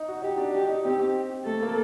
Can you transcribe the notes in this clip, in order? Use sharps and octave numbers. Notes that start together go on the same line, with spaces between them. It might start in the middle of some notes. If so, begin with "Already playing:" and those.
Already playing: D#4
F#4
D#4 G4
D4
G4
D#4
C4 G4
A3 A4
A#3